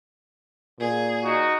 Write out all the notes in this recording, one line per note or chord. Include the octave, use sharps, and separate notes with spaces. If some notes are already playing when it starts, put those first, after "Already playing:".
A#2 G#4
D#4 F#4